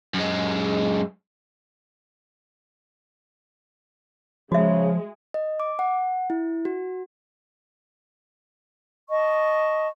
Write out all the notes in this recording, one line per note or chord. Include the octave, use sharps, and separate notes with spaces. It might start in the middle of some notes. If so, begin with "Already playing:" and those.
F#2 G#3
C#3 F3 G#3 F#4 E5
D#5
D6
F#5
E4
F#4
D#5 A5 C#6